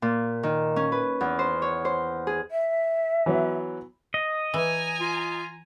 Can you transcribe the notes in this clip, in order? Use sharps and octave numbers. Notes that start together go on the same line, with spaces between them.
A#2
D#3
C#4
B4
E2
C5
C#5
C5
G#4
E5
E3 F#3 B3
D#5
E3 G#5 A#5
F4